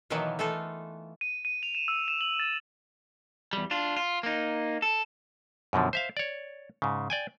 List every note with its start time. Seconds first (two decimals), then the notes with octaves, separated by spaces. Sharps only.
0.10 B2 D#3 E3 F#3 A#3 B3
0.39 E3 A3 D#4 F4 A4 F5
1.21 D#7
1.45 D#7
1.63 F7
1.75 E7
1.88 E6
2.08 E7
2.21 F#7
2.40 A6
3.53 E2 G3
3.71 D4 F4
3.96 F4
4.23 A#3 D#4
4.82 A4
5.73 F#2 B2 D3 F3
5.93 C5 E5 F5
6.17 C#5 D5
6.82 G#2 C#3
7.10 D5 G5 G#5